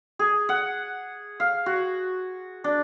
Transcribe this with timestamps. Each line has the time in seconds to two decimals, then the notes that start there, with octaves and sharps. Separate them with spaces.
0.19 G#4
0.49 F#5
1.40 F5
1.66 F#4
2.64 D4